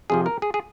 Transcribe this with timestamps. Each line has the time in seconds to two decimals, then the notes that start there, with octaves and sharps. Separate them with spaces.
0.10 F2 C3 F3 G#4
0.26 A#4
0.42 G#4
0.54 G#4